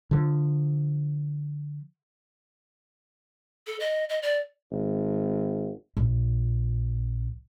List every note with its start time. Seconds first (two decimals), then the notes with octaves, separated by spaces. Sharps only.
0.11 D3 F3
3.67 A4
3.80 D#5
4.09 D#5
4.22 D5
4.71 G#1
5.97 A#1